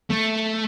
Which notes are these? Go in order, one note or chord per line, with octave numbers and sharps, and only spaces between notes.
A3